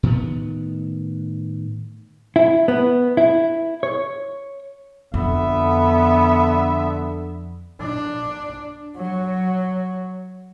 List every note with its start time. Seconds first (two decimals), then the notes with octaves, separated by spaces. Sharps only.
0.03 A2 D#3 B3
2.36 E4
2.68 B3
3.17 E4
3.83 C#5
5.14 F2 D3 B3 E5
7.81 D4
8.97 F#3